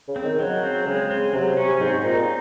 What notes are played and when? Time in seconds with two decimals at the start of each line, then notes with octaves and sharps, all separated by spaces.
0.08 C#3
0.16 C4
0.24 D#3
0.40 C#3 F#3
0.63 C4
0.86 C#3 G#3
1.11 C4
1.33 C3 F#3
1.57 C3 C#4
1.81 G#2 C4
2.04 A#2 D#4